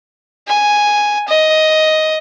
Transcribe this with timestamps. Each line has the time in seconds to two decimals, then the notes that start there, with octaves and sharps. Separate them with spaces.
0.47 G#5
1.28 D#5